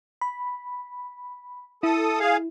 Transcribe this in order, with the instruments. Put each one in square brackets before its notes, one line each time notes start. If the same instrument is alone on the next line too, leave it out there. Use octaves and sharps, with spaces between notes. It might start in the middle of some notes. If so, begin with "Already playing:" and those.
[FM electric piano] B5
[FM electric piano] E4 [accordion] A4 D#6
[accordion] G#4 F5